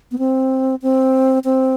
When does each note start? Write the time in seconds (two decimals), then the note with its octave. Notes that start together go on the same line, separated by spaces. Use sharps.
0.12 B3
0.19 C4
0.82 C4
1.44 C4